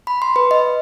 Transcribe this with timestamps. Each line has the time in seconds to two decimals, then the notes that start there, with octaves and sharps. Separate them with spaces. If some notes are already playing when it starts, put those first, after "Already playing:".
0.07 B5
0.22 C6
0.36 B4
0.51 D#5